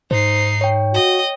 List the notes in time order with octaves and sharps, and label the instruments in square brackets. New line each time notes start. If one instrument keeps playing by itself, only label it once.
[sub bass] G#2 [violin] D#4 C7 [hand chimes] C5
[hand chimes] C#5 G5
[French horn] F#4 [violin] D#5